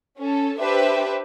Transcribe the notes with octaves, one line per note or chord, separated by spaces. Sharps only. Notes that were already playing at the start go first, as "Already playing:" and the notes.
C#4 A4
D4 G4 B4 C5 E5